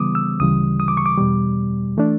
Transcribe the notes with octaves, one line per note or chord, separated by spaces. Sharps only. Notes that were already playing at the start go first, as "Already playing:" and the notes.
Already playing: C#3 E3 G3 B3 D6 D#6
E6
D2 C#3 E3 G3 D#6
D#6
D6
C#6
D6
E2 B2 G3
E3 A3 D4